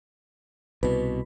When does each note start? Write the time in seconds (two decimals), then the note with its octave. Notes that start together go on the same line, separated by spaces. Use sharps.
0.83 C2 B2 B4